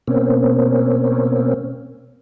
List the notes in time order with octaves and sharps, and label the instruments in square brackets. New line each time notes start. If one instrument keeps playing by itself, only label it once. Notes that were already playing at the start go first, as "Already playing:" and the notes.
[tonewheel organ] B2 A#3 C4 C#4